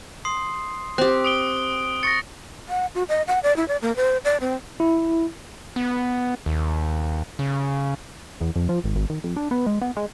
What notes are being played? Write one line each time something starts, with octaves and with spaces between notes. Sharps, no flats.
C6 D#6 C7
C4 G4 F#6
D#6 D7 G7
C#6 A6 A#6 C#7
F#5
F#4
D#5
F#5
D5
E4
D5
A#3
C5
D5
C4
E4
B3
D#2
C#3
E2
F2
F3
G#1
G#1
D#3
F2
D4
B3
G#3
B3
G#3